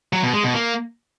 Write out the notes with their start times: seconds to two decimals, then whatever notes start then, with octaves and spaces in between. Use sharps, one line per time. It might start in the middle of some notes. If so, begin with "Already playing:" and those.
0.13 F#3
0.23 B2
0.33 G#3
0.44 B2
0.54 A#3